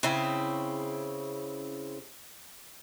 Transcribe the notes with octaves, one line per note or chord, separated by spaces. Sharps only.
C#3 C4 E4